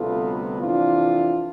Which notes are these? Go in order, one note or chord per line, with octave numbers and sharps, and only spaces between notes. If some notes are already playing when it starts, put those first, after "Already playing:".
Already playing: D2 C3 G3 B3 F4 A4
F2 C3 E3 D4 F4